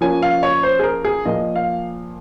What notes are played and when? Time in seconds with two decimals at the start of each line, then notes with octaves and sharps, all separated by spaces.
0.01 F3 A#3 C#4 G#5
0.23 F5
0.43 C#5
0.63 C5
0.79 G#4
0.83 A#4
1.05 G#4
1.25 A#2 F3 A#3 D#5
1.56 F5